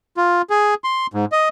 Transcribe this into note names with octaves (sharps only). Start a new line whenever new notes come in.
F4
G#4
C6
G#2
D#5